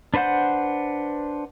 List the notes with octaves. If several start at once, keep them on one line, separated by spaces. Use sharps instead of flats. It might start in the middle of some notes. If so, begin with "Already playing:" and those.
D4 B4 C5 F#5 G6